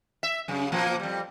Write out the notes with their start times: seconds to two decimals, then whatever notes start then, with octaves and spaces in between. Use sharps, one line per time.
0.23 E5
0.48 F#2 C#3
0.72 A#2 F3 A#3
1.00 F2 G3